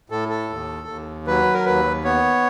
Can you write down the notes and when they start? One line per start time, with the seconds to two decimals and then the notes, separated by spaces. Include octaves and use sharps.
0.10 A2 A4
0.29 A4
0.50 D#2
0.88 D#2
1.27 F#3 B4
1.54 A#4
1.66 D#2 B4
2.04 B3 C#5